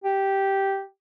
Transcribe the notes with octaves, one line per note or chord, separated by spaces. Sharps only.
G4